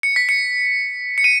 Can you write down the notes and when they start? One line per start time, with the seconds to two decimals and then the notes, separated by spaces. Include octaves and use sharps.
0.03 C#7
0.16 B6
0.29 C#7
1.18 C#7
1.24 D#7